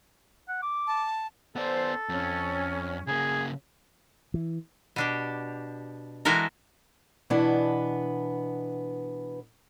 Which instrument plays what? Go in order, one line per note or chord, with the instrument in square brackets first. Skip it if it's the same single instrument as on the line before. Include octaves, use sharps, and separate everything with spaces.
[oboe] F#5
D6
[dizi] A5
[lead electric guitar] B3 D5 [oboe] A4 [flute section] C5
[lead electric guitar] F2 [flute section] C#4
[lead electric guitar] C#3 A#3 [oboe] G#4
[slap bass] E3
[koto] B2 D4 G4
E3 G#3 E4 F#4 A4 A#4
[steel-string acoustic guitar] B2 E3 B3 D4 A5